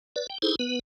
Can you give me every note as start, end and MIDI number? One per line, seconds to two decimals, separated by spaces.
0.16 0.27 71
0.16 0.27 74
0.30 0.38 79
0.42 0.56 63
0.42 0.56 64
0.42 0.56 68
0.42 0.56 69
0.42 0.56 72
0.59 0.79 59
0.59 0.79 71